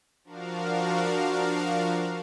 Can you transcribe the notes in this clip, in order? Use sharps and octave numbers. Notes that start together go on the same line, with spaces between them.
F3 D4 F#4 A#4 F5